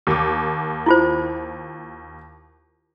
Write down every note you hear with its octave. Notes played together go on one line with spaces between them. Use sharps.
D#2 D6
E4 F4 C5